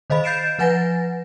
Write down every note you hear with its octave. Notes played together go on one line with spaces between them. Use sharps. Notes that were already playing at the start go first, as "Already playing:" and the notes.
D#3 C5 D#5 F5 B5
G6 A6 C7 D7 E7
F3 B4 F#5 G#5 A6 A#6